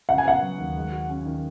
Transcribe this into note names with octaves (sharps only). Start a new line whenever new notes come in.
C#3 F#5
G#5
B3 F#5
F#3
D#2
G#3
F#4
C#4
D#3